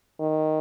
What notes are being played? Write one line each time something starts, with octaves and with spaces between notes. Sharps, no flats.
D#3